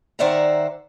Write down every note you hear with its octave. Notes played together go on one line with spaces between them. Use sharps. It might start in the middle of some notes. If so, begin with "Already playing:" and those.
D#3 C5 D5 E5 F#5 A#5